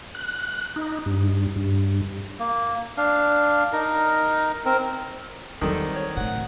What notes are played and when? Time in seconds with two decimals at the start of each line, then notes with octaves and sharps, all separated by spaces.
0.15 F#6
0.76 D#4
1.06 G2
1.56 G2
2.40 A#3
2.97 D4 F5
3.73 D#4 A#4
4.65 C4 A#4
5.61 E2 D#3 F#3 G3 C4 A4
5.95 C#5
6.17 A2 C#3 F#5